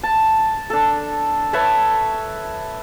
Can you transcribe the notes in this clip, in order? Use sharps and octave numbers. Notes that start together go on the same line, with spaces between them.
A5
D4 A4
B4 C#5 E5 A5